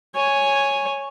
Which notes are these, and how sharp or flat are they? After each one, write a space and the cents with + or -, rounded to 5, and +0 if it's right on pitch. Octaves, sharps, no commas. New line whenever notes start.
C#5 +0 G#5 +0